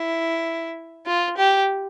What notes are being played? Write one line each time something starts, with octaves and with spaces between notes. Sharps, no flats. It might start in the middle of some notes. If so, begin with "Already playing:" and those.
Already playing: E4
F4
G4